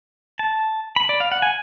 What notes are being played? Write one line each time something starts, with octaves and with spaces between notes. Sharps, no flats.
A5
B5
D5
F5
F#5
G#5